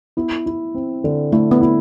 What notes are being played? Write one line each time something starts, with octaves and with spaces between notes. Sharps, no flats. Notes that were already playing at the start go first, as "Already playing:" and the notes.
B3 E4
E4
C4
D3
A3 E4
B3
E4